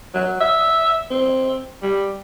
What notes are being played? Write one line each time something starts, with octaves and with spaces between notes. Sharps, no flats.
F#3
E5
C4
G3